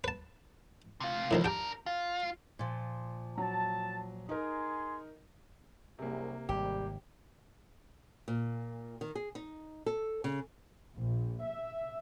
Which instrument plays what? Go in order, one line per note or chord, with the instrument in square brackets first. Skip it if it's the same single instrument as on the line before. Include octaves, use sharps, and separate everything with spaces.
[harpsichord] B4 A5
[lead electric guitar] C3 F4
[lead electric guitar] C2 [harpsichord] A2 D#3 F3
[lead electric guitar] D4 A#4 [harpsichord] G4 G5
[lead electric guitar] F4
[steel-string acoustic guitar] A#2 F3
[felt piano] F#3 [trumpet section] A5
[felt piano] D#4 A#4 [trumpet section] G#4 G#5 C6
[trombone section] C2 F#2 G#4 [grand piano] C3 A#3
[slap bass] G#1 [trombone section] G3 [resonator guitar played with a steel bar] G4
[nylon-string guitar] A#2
D#3
G#4
D#4
A4
C#3
[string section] A#1
E5